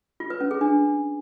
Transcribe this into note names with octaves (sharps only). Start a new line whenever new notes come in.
F4
B4
C#4
G#4
D4